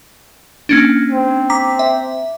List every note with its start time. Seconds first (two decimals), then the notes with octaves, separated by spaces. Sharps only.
0.69 A#3 C#4 D4
1.10 C4
1.50 A#5 D6 B6
1.79 E5